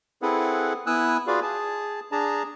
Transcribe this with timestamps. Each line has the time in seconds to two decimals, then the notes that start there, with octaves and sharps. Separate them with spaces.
0.22 C4 E4 G#4 A4 B4 F#5
0.87 B3 E4 G#5 D#6 E6 F#6
1.27 F4 F#4 G#4 B4 D5 F5
1.42 G#4 A5
2.12 D4 G#4 A5 A#5